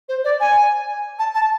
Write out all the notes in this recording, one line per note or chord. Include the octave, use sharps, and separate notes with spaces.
C5
D5
G#5
A5
A5